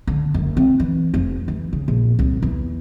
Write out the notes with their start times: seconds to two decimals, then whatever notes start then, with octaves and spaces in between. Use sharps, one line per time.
0.07 D3
0.34 F#1
0.57 C4
0.80 E3
1.14 F1
1.48 E3
1.73 C#3
1.88 A#1
2.19 C2
2.42 E2